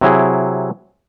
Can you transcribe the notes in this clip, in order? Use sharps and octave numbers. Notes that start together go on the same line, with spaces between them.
C3 F#3 E4 G#4